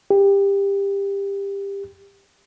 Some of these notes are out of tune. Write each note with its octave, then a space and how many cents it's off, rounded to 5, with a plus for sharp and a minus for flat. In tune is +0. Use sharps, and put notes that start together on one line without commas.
G4 +20